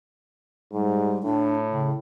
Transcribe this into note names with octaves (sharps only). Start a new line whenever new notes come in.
G#2 G3
A2 D4
C#3